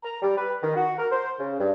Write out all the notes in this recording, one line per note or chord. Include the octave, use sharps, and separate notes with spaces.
A#5
G3
B4
D#3
F#4
A#4
C5
C#3
G2